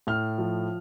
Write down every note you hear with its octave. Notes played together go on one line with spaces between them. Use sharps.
A2 F6
F3